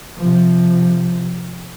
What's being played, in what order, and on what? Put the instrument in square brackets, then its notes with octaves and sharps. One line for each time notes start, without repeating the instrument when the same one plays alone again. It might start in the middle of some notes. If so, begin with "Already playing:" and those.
[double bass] C3 F3